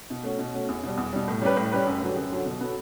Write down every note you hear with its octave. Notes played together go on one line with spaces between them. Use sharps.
B2
A3 C#4 F#4
B2
A3 C#4 F#4
E2
B2 G3
E2
B2 G3
A2
G3 C#4 G4 B4
A2
G3 C#4 G4 B4
F#2
D3 F#3
F#2
D3 F#3
B2
F#3 B3 F#4 A4